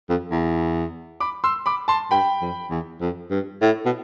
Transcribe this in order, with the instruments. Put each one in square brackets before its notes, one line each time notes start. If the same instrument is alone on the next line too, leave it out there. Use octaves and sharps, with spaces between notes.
[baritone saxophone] F2
E2
[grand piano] B5 D6
C6 E6
B5 D6
A5 C6
[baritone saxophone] G2 [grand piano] G5 B5
[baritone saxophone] F2
E2
F2
G2
A2
B2